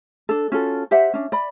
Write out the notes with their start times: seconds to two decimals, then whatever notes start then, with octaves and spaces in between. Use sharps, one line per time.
0.29 D4 A4
0.52 C#4 F4 F#4 A4
0.91 G4 C5 E5 F#5
1.13 C#4 D4
1.32 D5 B5